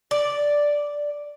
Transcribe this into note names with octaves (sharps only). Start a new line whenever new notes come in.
D5